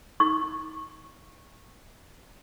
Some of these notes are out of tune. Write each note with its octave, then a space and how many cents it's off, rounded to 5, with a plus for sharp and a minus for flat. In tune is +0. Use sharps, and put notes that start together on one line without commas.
D#4 +25 C#6 -15